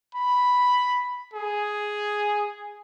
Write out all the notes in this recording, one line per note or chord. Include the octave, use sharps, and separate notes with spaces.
B5
G#4